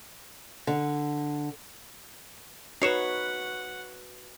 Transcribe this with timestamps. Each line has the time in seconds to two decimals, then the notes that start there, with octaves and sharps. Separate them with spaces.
0.67 D3
2.82 D#4 F#4 B4 C#5 F#5 C7 C#7 E7